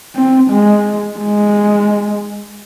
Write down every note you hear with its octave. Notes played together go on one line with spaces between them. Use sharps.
C4
G#3
G#3